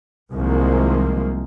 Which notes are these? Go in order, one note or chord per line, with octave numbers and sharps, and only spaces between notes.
C2 D#3 F3 G#3 A#3